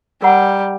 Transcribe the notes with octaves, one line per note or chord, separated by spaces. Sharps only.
G3 A#4 F#5 A#5